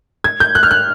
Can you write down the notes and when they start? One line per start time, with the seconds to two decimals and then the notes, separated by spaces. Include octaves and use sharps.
0.24 G#6
0.40 G6
0.55 F#6
0.63 F6
0.71 F#6